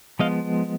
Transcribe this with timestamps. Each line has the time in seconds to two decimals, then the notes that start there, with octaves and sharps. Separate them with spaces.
0.19 F3 G#3 B3 D#5 F5